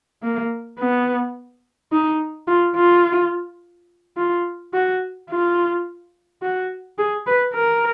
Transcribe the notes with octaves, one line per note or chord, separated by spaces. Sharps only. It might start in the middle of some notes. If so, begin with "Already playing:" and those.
A#3
B3
D#4
F4
F4
F4
F#4
F4
F#4
G#4
B4
A#4